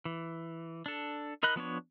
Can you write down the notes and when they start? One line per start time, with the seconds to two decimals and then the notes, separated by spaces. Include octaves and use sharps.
0.05 E3
0.86 D4 A4
1.43 D#4 A#4 D#5 B5 F#6
1.56 F3 B3 D4 C#5